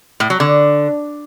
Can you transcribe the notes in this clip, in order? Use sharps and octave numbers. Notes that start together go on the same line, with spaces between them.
A2
F#3
D3